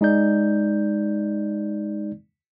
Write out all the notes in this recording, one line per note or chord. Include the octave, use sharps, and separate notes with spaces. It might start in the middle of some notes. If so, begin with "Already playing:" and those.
G#3 D#4 D5 G6